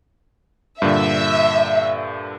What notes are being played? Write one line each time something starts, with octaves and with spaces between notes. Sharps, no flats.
G2 A#2 D3 E5